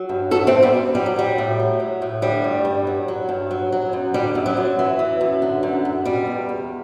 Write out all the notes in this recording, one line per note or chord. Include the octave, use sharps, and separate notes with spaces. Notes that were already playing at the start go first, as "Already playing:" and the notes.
Already playing: F#3
G2
E3 F#4 A4
A3 C4
E3
G3 B3
F#2
F#3 G3
F#3
F#3 G3
A2
F#3
F#3
A2
D3 G3
G2
G2
F#3
F#3
G2
F#3
F#3
F#2
D3 G3
F#2
F#3
F#2
E3
E3
F#2
D3
F#2
F#2
B2 G3
E2
E2